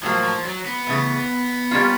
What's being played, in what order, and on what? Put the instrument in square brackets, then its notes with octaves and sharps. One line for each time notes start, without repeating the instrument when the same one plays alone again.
[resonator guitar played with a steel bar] A2 F#3 A#3 [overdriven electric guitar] F3
[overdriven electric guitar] F3
F#3
B3
[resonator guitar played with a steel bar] C#3 E3 A3
G3 A#3 C#4 F4